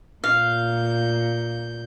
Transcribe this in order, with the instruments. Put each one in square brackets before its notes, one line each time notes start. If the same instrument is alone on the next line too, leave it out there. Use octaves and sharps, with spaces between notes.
[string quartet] A#2 G6 [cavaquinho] F5